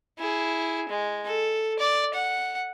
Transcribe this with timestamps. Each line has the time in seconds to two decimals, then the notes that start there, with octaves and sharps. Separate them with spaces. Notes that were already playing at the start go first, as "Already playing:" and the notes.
0.19 E4 G#4
0.89 G#3
1.26 A4
1.79 D5
2.14 F#5